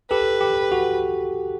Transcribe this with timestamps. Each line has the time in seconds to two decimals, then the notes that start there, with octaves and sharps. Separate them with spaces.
0.11 G4 A4 B4
0.41 G4
0.72 F#4